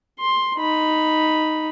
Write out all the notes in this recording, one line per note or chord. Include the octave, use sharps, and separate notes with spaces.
C6
D#4 B5